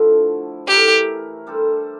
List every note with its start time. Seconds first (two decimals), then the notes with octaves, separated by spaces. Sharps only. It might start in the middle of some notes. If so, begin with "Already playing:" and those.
Already playing: D3 F3 A3 E4
0.67 E3 A3 E4 G4 A#4
1.47 G3 D4 A4 C5